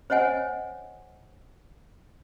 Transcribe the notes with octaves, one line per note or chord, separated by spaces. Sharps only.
C5 C#5 D#5 F#5 G#5